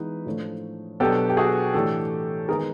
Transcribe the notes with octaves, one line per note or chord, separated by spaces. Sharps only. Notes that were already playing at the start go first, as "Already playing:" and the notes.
Already playing: E3 G#3 B3 D#4 B4
A2 F3 A3 D4
B2 F#3 B3 D4 G4 A4
G4
F#4 G#4
A2 E3 A3 D4 G4 A4
D#3 G#3 B3 D#4 G#4 A#4